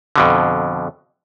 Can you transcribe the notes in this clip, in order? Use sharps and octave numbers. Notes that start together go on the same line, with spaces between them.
F2 B2 D3